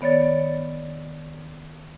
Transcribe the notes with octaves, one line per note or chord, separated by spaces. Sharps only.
D#3 B3 C#5 D5 A6